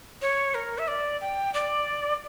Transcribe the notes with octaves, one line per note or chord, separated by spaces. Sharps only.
C#5
A#4
E5
D5
G5
D5